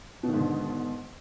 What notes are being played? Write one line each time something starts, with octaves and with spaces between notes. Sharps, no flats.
G#2 B2 D3 D#3